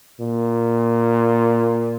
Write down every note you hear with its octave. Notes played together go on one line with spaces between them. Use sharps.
A#2